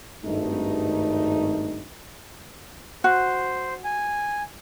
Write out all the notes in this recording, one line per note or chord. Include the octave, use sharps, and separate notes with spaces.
G#1 G2 A3 D#4
F#4 C5
G#5